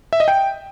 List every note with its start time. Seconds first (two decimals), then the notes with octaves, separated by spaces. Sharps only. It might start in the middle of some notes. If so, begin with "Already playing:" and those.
0.13 E5
0.20 D#5
0.28 G5